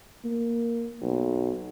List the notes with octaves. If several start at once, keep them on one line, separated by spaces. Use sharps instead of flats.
A#3
B1